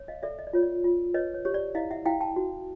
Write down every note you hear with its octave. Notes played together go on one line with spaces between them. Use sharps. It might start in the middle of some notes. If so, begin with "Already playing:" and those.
Already playing: C#5
D#5 F5
A4 D5 E5
D#5
D5
F4 C#5
D5
F4
B4 C#5 D#5
C#5
G4 C#5
D5
E4 D#5 F5
E5 F#5
E4 F5 G5
G5 A5
F#4